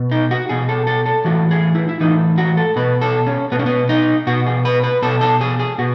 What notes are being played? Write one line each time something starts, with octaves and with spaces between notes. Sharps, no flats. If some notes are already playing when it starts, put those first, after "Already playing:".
Already playing: B2
D#4
F#4
B2 G#4
A4
A4
A4
A2 E3 F#4
G#4
E4
E4
A2 E3 D#4
F#4
A4
B2 B4
A4
C#4
B2 B3
C#4
B3
D#4
B2 F#4
G#4
B4
B4
B2 A4
A4
G#4
G#4
B2 F#4